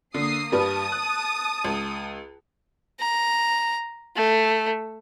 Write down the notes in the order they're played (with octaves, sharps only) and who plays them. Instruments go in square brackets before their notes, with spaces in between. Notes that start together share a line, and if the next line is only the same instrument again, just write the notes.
[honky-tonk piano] D3 [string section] A#3 D#6 C7
[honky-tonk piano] G2 G3 B4 [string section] A5 D#6
[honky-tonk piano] F#6
C#2
[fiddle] A#5
A3